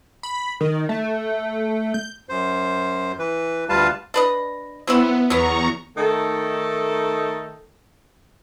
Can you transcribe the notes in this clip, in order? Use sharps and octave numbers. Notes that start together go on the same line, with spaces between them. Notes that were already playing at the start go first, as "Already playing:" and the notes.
B5
D#3
A3
G6
F#2 C5
E3 B4
D2 G3 F4 B4 F5 A5
D4 B4 D#5
F#3 B3 C4 E4
E2 F#3 B3 A#5 C#6
D#3 A3 D#4 A4